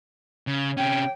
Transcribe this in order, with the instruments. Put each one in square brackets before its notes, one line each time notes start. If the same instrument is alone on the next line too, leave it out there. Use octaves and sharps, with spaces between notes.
[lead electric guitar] C#3
[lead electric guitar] C3 C#4 [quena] G5